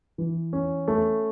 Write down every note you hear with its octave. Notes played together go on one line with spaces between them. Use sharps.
E3
C#4
A3